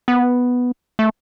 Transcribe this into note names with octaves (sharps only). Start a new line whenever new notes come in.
B3
A3